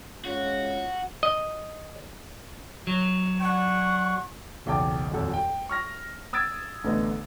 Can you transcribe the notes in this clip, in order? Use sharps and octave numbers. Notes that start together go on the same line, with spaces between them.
G#3 C#4 F4 F#4
D#5
F#3
D4 F#5 C#6
F#1 B1 E2 G5 A5 D6
D#1 G#1 F2 A4
G5
C#6 F6 A#6
D#6 E6 G#6 A6 D7
A1 D3 A3 B3 D#5